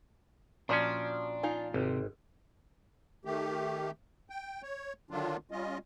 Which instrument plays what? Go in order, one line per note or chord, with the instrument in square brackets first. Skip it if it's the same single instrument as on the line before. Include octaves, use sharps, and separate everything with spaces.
[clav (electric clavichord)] A#2 F3 C#4 [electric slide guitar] D4 [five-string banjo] F#4 D5
[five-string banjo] D#4 F4 G#5
[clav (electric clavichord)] G#1 [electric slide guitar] C3
[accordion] D#3 A3 G4
G5
C#5
D3 D#3 F#3 D4 F4
G3 C#4 F4 D#5